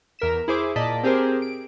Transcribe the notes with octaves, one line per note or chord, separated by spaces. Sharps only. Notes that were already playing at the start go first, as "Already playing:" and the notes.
E2 A#4 B6 E7
E4 G#4 C5 D6
A#2 D5 D#5 A5 B6
C4 G4 G#4 A#4 C5
D7